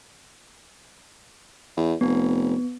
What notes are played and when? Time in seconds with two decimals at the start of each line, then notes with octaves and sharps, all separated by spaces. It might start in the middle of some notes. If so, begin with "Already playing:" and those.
1.77 E2
2.01 F1 B3